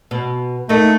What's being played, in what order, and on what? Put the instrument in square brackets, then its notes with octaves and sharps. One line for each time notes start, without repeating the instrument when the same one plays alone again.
[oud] B2
[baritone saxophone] A3 [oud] A#3 D#4